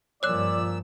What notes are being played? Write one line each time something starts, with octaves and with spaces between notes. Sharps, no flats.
G2 A#2 F3 C#5 D5 E6 F#6